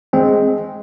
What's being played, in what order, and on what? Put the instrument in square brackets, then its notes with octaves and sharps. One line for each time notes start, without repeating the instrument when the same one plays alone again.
[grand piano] G#3 [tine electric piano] C4